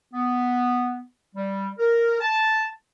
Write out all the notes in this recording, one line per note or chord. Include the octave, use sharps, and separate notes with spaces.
B3
G3
A#4
A5